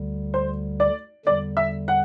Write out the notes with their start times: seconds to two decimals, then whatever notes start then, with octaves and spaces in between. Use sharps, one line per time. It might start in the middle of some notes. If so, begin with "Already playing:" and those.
Already playing: D2 D3 G3
0.34 C5
0.80 D5
1.26 E2 D3 G3 D5
1.57 E5
1.88 F#5